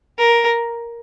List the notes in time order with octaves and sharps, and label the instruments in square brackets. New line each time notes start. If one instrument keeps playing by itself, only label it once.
[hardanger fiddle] A#4